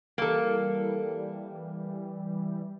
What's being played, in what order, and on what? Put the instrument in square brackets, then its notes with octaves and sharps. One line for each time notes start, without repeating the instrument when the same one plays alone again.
[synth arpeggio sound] E3 G3 [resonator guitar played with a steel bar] A#3 A4